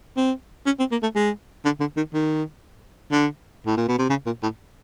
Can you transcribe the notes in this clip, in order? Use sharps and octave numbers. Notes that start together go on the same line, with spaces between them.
C4
C#4
C4
A#3
A3
G#3
D3
D3
D#3
D#3
D3
A2
A#2
B2
C3
C#3
A#2
A2